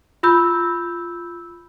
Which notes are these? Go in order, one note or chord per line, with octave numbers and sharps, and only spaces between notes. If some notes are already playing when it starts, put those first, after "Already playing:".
F4 B5 E6 G6